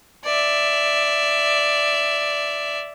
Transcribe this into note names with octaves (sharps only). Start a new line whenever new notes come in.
D5 E5